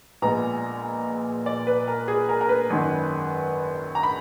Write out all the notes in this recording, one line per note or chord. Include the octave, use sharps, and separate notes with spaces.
A#1 A#2 G#3 B3 A#5
D5
B4
A#4
G#4
A#4
A#4
B4
G#1 F#2 D#3
A#5
B5